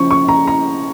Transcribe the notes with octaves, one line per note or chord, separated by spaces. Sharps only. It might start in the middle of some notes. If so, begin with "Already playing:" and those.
Already playing: C#3 F3 C#4 C#6
C#6
A#5
A#5